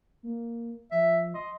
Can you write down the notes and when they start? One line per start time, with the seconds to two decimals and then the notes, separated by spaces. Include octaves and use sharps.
0.23 A#3
0.91 F3 E5
1.34 D#5 C6